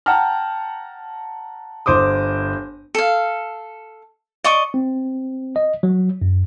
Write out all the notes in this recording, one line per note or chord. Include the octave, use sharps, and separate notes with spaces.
F#5 G5 A5 A#5 F6
G1 C5 D6 D#6
A4 F5
D5 D#5 C#6 D6
C4
D#5
F#3
F#2